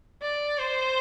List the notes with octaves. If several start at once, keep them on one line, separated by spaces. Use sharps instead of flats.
D5
C5